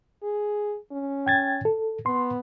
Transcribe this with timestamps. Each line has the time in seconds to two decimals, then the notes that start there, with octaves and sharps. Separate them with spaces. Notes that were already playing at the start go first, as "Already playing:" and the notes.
0.23 G#4
0.91 C#4
1.26 G5 G#6 A6
1.65 A4
2.06 B3 C6